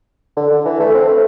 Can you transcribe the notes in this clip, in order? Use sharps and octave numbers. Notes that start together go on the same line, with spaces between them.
D3
D3
E3
A3
C4
A3